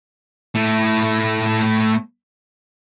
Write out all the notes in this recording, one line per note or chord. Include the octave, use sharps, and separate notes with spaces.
A2 A3